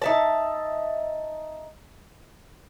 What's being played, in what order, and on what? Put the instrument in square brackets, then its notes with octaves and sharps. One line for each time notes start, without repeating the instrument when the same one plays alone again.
[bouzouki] D#4 E5 A5